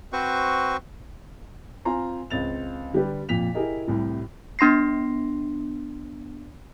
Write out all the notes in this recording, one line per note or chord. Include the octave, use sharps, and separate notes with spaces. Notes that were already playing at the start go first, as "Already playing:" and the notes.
C4 F#4 B4 C5 C#6
C4 F4 G#5 A#5 C6
C#2 C4 A6 F7
D3 G3 D4 G4 B4
F2 A#2 B6 F7
E4 G4 G#4 A#4 D#5
C2 A2 C3
B3 D4 C6 A#6 C7